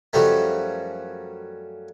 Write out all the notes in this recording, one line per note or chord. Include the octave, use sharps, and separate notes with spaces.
F#2 F3 G3 A3